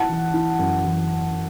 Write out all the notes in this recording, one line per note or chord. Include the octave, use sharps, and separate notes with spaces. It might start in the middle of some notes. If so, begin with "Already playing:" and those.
Already playing: E4 F#5 A5
E3
E4
F#2
E3